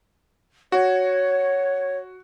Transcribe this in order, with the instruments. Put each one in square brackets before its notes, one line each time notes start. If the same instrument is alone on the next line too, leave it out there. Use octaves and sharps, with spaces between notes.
[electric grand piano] F#4 [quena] C#5